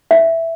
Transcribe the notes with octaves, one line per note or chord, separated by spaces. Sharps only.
E5